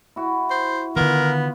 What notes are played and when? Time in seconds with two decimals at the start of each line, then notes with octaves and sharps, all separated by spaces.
0.16 E4 F#4
0.51 C5
0.96 D3 D#3 B3 F4 A#4